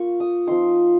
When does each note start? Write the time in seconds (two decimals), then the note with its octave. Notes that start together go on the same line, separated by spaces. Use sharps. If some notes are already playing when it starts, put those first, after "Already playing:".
Already playing: A#3 F4 C#6
0.20 D#6
0.47 F3 C4 D#4 C6